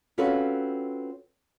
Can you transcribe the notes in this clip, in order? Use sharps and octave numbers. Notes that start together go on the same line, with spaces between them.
C4 C#4 F4 F#4 A4 B4